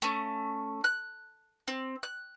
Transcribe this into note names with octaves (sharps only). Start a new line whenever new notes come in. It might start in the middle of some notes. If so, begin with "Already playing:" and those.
A3 C#4
F#6
C4
F#6